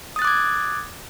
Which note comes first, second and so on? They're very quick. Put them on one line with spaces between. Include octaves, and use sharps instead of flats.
D#6 A6 F#6 D6 G#6